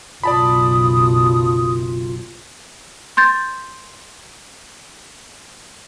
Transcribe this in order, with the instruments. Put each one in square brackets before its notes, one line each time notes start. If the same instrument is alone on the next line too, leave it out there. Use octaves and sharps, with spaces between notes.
[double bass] F#1 B1 [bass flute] F4 [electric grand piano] D5 A5 B5 [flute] D#6
[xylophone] C6 G6 A6